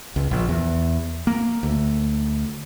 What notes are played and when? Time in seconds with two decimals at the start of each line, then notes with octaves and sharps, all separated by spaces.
0.16 C#2
0.31 A#1
0.49 E2
1.27 A#3
1.63 D2